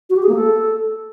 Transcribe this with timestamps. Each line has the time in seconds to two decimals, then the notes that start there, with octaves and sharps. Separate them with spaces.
0.10 F#4
0.16 G4
0.23 G#4
0.29 A#3
0.35 A4